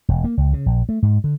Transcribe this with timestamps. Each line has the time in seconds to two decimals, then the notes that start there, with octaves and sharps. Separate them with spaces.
0.08 E1
0.24 A#3
0.37 C#2
0.53 C#3
0.66 A#1
0.89 A3
1.03 G#2
1.24 D3